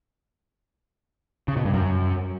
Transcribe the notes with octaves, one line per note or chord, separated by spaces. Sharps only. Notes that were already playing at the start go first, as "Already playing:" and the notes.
C#3
B2
G2
F#2